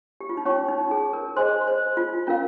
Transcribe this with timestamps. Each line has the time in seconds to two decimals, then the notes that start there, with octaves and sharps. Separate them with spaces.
0.21 G4
0.29 F4
0.37 D#4
0.45 C#4 C#5 G5 C#6
0.68 D#4
0.91 G#4
1.13 A#4
1.36 G#4 C5 D#5 G#5 C6
1.67 C5
1.97 F4
2.27 C#4 F4 A#4 F5